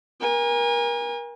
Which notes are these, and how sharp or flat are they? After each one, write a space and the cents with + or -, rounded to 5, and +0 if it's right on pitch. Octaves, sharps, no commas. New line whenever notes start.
A#4 +30 G#5 -30